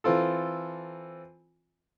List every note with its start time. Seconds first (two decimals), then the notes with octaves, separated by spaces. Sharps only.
0.04 E3 C4 F4 A4